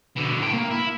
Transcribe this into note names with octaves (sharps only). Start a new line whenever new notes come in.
B2 D3
A2 G5
A#3
E4